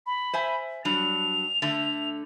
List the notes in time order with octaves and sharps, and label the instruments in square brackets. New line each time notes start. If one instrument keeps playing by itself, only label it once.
[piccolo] B5
[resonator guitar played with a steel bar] C5 E5 G#5
[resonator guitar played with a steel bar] F#3 G3 D4 [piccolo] F7
[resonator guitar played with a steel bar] D3 A3